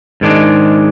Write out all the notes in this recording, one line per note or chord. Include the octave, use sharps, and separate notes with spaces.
G#2 D#3 G#3 D4